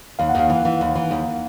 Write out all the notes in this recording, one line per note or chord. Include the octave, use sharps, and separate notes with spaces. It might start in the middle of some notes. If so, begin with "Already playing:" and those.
D#2 F5
F#5
D#2 F5
E3
E3
D#2
E3
D#2